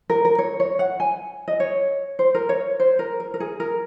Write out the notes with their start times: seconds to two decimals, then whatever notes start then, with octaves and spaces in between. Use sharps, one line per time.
0.10 A#4
0.25 A#4
0.39 C#5
0.60 C#5
0.79 F#5
1.00 G#5
1.48 D#5
1.60 C#5
2.19 C5
2.35 A#4
2.49 C#5
2.80 C5
2.99 A#4
3.20 A#4
3.34 A#4
3.40 G#4
3.60 A#4